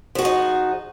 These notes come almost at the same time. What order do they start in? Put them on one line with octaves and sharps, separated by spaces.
F3 F#4 G#4 D#4